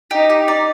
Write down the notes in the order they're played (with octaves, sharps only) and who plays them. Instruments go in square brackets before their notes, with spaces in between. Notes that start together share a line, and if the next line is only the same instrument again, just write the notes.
[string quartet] D#4 [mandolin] G4
[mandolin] G4
D5